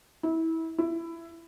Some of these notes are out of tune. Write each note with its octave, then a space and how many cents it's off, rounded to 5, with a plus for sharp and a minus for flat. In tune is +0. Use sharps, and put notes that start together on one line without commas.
E4 -25
E4 +15